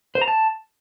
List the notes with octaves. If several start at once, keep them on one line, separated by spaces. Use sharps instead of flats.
C5
A#5
A5